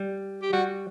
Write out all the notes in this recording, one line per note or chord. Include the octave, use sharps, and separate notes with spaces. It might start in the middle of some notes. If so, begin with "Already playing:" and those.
Already playing: G3
G4
G3 F#4